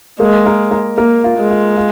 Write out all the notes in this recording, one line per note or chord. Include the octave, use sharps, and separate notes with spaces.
G#3 A#3
A#4
A#4
A#3 A#4
F4
G#3
F4
F4